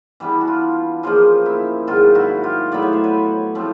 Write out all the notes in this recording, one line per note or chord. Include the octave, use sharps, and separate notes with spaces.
E3 G3 B3 D4
F#4
F4
C#3 F3 A#3 D#4 F4
E4
G#2 D#3 F#3 F4
E4 F#4
F4 G4
A2 F#3 B3 E4 D5
C#5
C5
B4 C#5
A2 F3 A3 C4